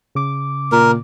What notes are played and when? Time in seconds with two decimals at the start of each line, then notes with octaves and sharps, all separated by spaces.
0.15 C#3 D6
0.72 A#2 A#4